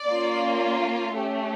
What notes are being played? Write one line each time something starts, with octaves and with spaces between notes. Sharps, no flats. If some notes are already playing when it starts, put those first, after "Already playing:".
Already playing: D5
A#3 C#4 F4
A3 C#4 G4